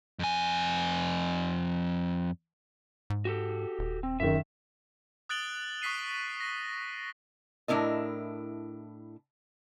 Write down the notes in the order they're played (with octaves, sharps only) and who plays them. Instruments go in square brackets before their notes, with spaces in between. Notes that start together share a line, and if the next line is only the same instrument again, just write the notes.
[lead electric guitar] F2 G#5
[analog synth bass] G#2
[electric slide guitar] F#4 G4 A4
[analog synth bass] D#1
[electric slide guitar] C4
[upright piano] F#2 D#3 [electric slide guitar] E5
[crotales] D#6 F#6 A6 D7 F#7 G7
C#6 D#6 B6 C7 D#7
A#6
[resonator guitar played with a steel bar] A2 D4 E4 A#4 D#5